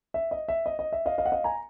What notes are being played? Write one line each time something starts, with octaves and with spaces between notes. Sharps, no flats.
E5
D#5
E5
D#5
D#5
E5
D#5 F5
D#5 F5
F#5
D#5 F5
G#5 A#5